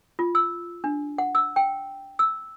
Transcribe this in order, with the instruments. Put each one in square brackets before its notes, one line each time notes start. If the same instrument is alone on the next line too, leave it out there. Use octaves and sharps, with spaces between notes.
[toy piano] F4
E6
D4
F#5
E6
G5
E6